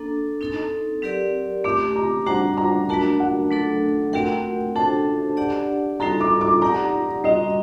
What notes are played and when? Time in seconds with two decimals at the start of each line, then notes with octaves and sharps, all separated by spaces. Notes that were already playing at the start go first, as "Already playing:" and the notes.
Already playing: A#3 D4 A4
0.41 C4 D#4 A4
1.02 F#3 C4 G4 A#4 D5
1.64 A3 C4 G4 D6
1.96 A#5
2.26 G3 D4 F#4 C5 F#5 A#5
2.57 A#5
2.89 F#3 A3 D4 F#4 A#4 A5
3.20 F#5
3.51 F#3 A3 D4 A4
4.13 A3 C4 F#4 A#4 F#5 G5
4.76 D4 F#4 A4 C5 A5
5.37 D4 G4 D5 F#5
6.00 G3 C4 D#4 F#4 A4 A#5
6.21 D6
6.41 D6
6.62 D#4 G4 D5 F#5 A#5
7.24 G3 C4 F#4 D#5